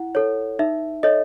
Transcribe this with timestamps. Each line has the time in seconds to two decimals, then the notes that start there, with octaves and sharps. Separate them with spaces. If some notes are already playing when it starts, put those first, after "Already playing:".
Already playing: E4 F#5
0.15 A4 C#5
0.59 D#4 E5
1.03 A4 C#5 D#5